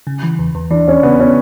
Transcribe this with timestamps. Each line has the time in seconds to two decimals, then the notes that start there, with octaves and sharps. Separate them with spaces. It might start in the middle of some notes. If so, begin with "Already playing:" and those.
0.07 C#3
0.23 E3
0.39 E2
0.55 E2
0.70 E3 D4
0.87 E2 C#4
1.03 C#3 B3
1.19 C#3 C#4